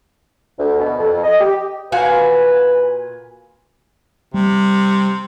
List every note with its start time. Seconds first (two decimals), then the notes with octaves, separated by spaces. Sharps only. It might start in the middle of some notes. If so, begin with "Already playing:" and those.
0.58 D2
0.78 B2
0.99 F2
1.23 D#5
1.40 G4
1.92 A#2 F#4 B4 F5 G#5
4.34 C3 G3